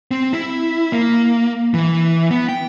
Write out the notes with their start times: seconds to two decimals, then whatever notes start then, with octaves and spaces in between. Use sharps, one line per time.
0.11 C4
0.33 E4
0.92 A#3
1.74 E3
2.30 B3
2.49 G5